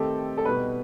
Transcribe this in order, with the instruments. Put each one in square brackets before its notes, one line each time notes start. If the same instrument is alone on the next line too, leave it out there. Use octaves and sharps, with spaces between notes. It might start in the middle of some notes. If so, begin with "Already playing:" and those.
Already playing: [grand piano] D#3 A3 C4 D#4 G4 [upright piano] A4
[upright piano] A4
[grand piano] B2 G3 D#4 [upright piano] B4